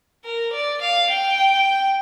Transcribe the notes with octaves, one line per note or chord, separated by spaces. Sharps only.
A#4
D5
F5
G5